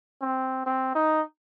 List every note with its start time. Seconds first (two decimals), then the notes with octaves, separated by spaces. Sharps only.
0.21 C4
0.66 C4
0.95 D#4